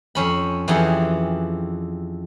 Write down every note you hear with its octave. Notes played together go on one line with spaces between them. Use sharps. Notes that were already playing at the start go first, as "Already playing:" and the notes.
F2 C#4 B5
F2 E3 F4 G4 G#4 F#5